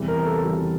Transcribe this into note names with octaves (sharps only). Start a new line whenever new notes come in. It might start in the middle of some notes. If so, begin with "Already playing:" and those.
Already playing: E2 C3 E3 G3
A#4
A4
E2 C3 E3 G3